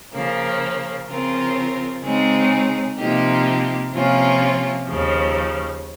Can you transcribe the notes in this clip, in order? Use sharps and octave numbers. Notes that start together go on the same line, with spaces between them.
C#3 F3 A#3
C#3 F3 C4 F4 A#4
C#3 G#3 C4 D#4 G#4
C3 F3 A#3 D#4 G4
C3 F3 A#3 C#4 F4
D#2 C#3 F3